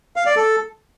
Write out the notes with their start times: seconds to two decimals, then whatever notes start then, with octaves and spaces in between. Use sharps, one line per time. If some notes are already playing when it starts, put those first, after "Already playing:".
0.16 F5
0.26 D5
0.36 A4